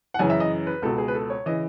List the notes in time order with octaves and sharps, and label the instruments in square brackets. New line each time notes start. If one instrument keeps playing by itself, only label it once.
[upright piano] F#5
F#2 C#3 E3 G#5
E5
D#5
B4
C#2 B2 A4
G#4
B4
A4
C#5
C#3 E3 D#5